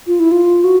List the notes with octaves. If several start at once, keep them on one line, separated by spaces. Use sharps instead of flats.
F4
E4
F4
F#4